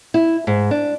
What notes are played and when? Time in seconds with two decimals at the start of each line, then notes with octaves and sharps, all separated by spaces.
0.14 E4
0.47 G#2
0.71 D4